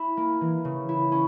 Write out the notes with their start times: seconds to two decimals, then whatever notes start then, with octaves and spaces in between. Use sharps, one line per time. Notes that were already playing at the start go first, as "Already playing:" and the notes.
Already playing: E4
0.17 A#3
0.41 E3
0.65 C#3
0.89 E4
1.12 C#4